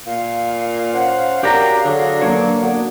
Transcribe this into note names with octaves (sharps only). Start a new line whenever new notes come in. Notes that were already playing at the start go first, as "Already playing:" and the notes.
A#2 F5
C#4 C5 F#5
C#4 D4 F#4 G4 A#4 A#5
D3 F#3 G#4
G2 F#3 A#3 D4 C#5
D3 F#3 B3